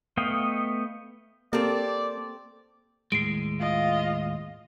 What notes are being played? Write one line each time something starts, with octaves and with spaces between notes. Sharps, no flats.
A3 B3 D#5 F5 G5
A#3 C4 G4 A4 D5
D#2 A2 G#3 C7 D7
F4 D#5